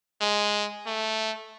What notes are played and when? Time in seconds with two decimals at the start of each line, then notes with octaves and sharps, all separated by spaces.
0.21 G#3
0.86 A3